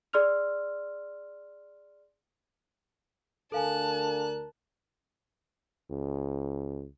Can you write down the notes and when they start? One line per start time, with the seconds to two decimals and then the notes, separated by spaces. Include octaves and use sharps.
0.13 G#4 D5 C6 E6 F6 F7
3.52 D2 D4 A4 A#4 F5 G#5 A5 F#6
5.91 C#2